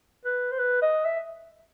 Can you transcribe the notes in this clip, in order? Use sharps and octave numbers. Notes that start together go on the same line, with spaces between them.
B4
C5
B4
D#5
E5